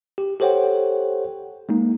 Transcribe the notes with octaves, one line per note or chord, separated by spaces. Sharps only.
G4
G4 A4 C5 C#5 F#5 G5
G#3 A#3 D#4